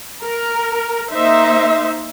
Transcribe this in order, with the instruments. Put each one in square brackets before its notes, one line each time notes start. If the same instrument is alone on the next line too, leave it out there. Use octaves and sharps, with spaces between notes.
[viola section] A#4
A#3 D#4 C5 E5